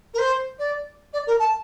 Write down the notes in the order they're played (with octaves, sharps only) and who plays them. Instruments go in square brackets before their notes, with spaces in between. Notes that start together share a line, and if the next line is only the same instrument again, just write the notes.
[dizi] A#4
C5
D5
D5
A#4
A5